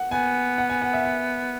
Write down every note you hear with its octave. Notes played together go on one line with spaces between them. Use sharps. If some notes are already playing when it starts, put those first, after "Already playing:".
Already playing: F#5
B3 G#5
F#5
G#5
F#5
E5
F#5